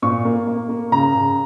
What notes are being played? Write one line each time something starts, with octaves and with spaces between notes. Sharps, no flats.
A#2 C#6
A#3
A#3
A#3
C#3 A#5
C#3